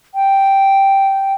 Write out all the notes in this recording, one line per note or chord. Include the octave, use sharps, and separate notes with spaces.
G5